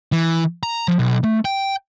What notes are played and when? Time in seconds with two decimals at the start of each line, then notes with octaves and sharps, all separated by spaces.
0.12 E3
0.63 A#5
0.88 F3
0.99 B1
1.24 A3
1.45 G5